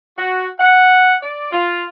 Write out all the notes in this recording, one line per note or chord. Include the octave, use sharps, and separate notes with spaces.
F#4
F#5
D5
F4